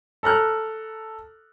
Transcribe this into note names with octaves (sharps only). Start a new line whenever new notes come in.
A4 A#5 F6 F#6